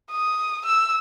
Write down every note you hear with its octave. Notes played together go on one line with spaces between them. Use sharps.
D#6
E6